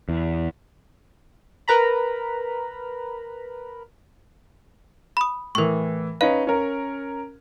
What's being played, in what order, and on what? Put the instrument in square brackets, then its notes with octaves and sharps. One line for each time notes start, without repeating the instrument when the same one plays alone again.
[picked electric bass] E2
[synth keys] A#4 B4 A#5 B5
[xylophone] B5 D#6
[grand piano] A2 E3 [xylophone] A#4 C#6
[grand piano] C#4 D#4 B4 [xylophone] F5
[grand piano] C#4 A#4